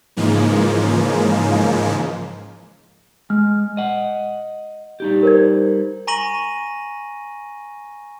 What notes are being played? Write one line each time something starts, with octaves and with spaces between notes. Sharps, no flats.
G#2 C#3 E3 F3 G#3 A#3
G#3 F6
D#5 F#5
G3 D#4 G4
A#4 C5 G#6
G#5 A#5 C#6 A#6 D#7 F#7